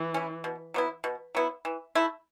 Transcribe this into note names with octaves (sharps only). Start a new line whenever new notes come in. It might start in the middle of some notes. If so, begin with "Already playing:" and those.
Already playing: E3
C#4 E4
B2
F#3 B3 E4
B2
F#3 B3 E4
E3
A3 E4